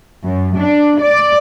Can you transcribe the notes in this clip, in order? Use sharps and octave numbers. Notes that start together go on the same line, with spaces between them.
F#2
D4
D5